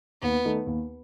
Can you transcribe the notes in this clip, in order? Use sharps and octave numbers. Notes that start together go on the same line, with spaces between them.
D#2 B3
D#3 A3 D#4
D#2